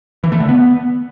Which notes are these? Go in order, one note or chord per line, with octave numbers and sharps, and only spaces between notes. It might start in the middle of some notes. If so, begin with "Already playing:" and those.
E3
A3
D3
B3